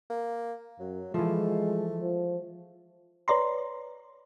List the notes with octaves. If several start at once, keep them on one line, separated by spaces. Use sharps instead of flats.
A#3
F#2 F#3
E3 F3 G#3 A3
F3
B4 C#5 D5 A#5 C6